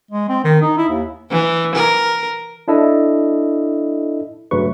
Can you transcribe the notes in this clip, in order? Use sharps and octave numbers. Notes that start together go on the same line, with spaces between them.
G#3
C4
D#3
D#4
E4
D#2
E3
A#4
D4 E4 A4 D#5
G2 C#3 F#3 A3 B4 C#6